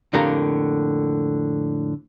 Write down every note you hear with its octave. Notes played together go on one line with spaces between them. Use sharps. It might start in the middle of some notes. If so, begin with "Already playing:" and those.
F2 A2 D3 A#3 G4 A#5